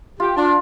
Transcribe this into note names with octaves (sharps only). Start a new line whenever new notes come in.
F4 G4
D4 F4